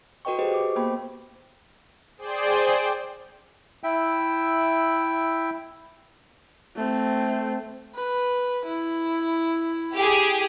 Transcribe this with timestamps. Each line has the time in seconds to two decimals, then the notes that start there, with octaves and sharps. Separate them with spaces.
0.25 F#4 A4 B4 D#5 G5 C#6
0.39 G4 G#4 B4 C5 D#5
0.54 D6
0.76 A#3 B3 C5 G5 B5
2.18 G#4 C5 D5 G5
3.83 E4 E5 G5
6.76 A3 C4
7.95 B4
8.65 E4
9.95 G4 G#4